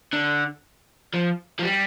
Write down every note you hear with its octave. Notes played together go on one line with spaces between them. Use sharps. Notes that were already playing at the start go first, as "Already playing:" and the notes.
D3
F3
F3
G3